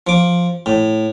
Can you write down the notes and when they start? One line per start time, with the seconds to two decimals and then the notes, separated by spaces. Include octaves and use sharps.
0.07 F3 D6
0.66 A2